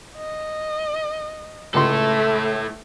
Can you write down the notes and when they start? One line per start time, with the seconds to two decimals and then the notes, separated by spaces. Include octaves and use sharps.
0.17 D#5
1.74 C#2 A3 E4 A4 C6